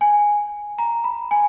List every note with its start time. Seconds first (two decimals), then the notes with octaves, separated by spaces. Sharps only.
0.01 G#5
0.78 A#5
1.04 B5
1.31 G#5